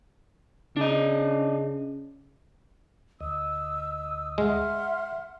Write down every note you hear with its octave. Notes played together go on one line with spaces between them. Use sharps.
C#3 D4 D#5
D2 D#5 E6
G#3 E5 F#5 C6 F6